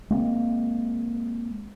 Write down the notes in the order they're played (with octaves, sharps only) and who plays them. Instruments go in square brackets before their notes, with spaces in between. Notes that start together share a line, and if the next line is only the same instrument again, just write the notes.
[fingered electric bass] G#3 A#3 C4